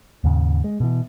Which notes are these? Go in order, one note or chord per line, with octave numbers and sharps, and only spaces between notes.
D#2 G#2 C#3
G#3
B2 E3